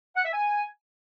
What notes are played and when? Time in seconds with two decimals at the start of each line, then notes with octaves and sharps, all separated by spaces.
0.16 F#5
0.25 E5
0.33 G#5